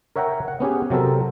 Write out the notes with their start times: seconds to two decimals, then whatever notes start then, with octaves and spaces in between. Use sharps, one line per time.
0.16 A#4 C#5 E5 F#5 G5 A#5
0.48 F#5
0.60 B3 C#4 G4 G#4
0.90 C3 F#3 C4 A4 A#4